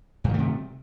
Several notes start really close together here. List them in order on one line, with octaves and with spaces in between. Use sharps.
G2 D#3 A3 C3